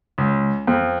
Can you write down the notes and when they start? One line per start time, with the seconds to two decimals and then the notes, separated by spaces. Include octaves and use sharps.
0.18 C#2
0.67 F2